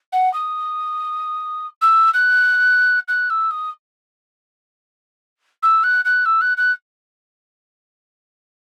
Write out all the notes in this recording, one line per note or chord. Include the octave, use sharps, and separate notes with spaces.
F#5
D#6
E6
F#6
F#6
E6
D#6
E6
F#6
F#6
E6
F#6
F#6